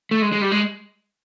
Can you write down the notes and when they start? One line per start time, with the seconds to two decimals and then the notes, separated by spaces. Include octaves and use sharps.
0.11 A3
0.22 G#3
0.32 G#3
0.41 G3
0.52 G#3